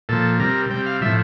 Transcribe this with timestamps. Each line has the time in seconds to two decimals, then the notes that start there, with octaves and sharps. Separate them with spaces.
0.09 A#2 F3 A4
0.39 C3 G3 A#4
0.70 C3 G3 G5
0.86 F5
1.02 A2 F3 E5